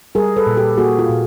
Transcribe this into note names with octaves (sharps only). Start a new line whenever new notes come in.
G3 G#4 A#4
A4 B4
A#2
G4 A4
A#3 F#4 G#4
F4 G4
A#2